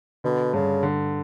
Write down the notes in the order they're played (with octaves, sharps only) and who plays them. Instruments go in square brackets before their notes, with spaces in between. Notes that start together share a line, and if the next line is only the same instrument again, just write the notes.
[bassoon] B2 [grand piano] D3
[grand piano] G2 [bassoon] C#3
[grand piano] D3